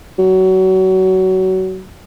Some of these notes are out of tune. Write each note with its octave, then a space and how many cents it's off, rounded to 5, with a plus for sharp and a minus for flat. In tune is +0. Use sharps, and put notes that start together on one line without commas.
F#3 +25